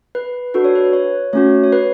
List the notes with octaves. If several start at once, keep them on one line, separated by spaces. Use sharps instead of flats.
B4
D4 F#4 A4 B4
C#5
B4
C#5
A3 C#4 F#4 C#5
C#5
B4